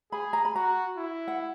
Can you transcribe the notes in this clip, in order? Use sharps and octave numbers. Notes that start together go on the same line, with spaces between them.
G#4 B5
A#5
B5
F#4 A#5
E4
F#5